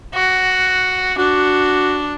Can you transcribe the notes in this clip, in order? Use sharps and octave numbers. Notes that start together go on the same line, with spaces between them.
F#4
D4 F#4